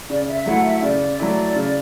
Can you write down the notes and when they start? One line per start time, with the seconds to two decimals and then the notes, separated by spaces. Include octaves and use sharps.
0.10 C#3 D5
0.28 E5
0.46 F#3 A3 E4 F#5
0.64 E5
0.82 C#3 D5
1.20 F#3 A3 E4
1.56 C#3